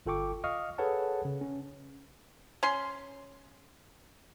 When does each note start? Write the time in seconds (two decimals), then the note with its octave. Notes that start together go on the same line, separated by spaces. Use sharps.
0.06 G1 F4 A4 G5 C#6 D6
0.44 D#5 F5 C#6 D#6 F6
0.78 G#4 A4 B4 C#5 F#5 A5
1.25 C#3
1.41 C#4
2.63 C#4 C6